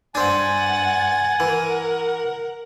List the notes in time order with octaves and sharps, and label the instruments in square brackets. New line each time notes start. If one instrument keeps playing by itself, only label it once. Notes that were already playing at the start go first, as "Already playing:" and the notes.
[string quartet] G2 F#5 A6 [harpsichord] C4 D4 [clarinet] G#5
[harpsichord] E3 [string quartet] A#4 F#5